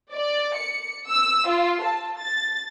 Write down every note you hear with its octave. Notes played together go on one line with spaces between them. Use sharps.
D5
C#7
E6
F4
A5
A6